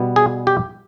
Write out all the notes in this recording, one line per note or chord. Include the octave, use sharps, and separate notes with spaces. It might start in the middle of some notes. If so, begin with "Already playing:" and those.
Already playing: B2 G3 B3
G#4
G4